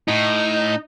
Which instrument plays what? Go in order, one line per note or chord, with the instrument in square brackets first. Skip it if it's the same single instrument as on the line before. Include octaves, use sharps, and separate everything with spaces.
[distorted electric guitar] A2 [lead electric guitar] D#4